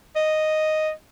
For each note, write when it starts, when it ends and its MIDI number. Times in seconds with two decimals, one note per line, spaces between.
0.16 0.91 75